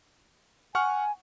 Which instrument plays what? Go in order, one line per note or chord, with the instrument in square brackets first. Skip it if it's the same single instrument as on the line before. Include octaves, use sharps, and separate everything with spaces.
[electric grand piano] F#5 C#6 F6 [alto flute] G#5